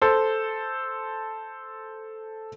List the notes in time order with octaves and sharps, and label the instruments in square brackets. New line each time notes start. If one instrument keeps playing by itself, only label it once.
[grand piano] A4 C5